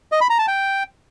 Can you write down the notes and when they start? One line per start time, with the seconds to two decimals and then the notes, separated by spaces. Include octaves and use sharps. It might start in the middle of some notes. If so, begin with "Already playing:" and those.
0.12 D#5
0.21 B5
0.30 A#5
0.39 A5
0.48 G5